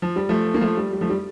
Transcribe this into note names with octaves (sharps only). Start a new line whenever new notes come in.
F3
G3
F3 A3
A#3
F3 A3
G3
G3
F3 A3
G3